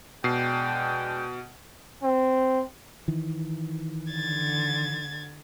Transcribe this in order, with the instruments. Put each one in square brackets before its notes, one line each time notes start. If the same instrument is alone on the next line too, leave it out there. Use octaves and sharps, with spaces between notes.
[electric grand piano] B2 C7 [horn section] G#3 D4 G5
[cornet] C4
[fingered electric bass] D#3 E3
[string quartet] D3 G#6 A6